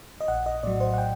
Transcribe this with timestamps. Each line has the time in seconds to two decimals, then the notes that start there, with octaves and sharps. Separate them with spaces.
0.21 D#5
0.28 A#1 F#5
0.46 D#5
0.63 A2 F#3 D5
0.80 C5
0.94 F#5
0.98 G5